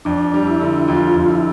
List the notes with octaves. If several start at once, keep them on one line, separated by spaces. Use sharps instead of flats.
F2 D4
G3
E4
D3
F2 F4
F2
E4